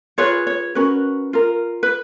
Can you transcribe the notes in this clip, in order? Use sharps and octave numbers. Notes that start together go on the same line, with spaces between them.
F4 G#4 B4 C#5
C#5
C#4 F#4 A#4 B4
F4 A#4
B4